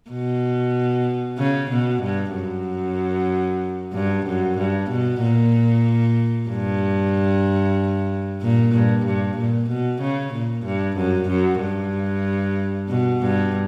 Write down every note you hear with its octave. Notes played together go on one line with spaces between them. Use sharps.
B2
C#3
B2
G2
F#2
G2
F#2
G2
B2
A#2
G2
A#2
G2
G2
A#2
B2
C#3
A#2
G2
F#2
F#2
G2
B2
G2